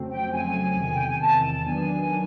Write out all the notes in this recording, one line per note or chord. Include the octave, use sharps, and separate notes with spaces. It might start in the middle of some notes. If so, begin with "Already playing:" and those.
Already playing: F2 C#3 F#3 A3 C4
G5
F2 C#3 F#3 A3 C4 G#5
E2 C3 D#3
G5
G#5
E2 C3 D#3 A5
D#3 F#3 B3 D4 G#5
D#3